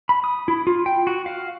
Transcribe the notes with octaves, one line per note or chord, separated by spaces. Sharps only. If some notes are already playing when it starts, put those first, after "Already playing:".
B5
D#6
E4
F4
G5
F#4
F5